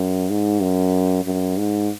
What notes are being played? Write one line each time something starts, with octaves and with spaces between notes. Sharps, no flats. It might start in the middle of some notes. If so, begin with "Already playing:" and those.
Already playing: F#2
G#2
F#2
F#2
G#2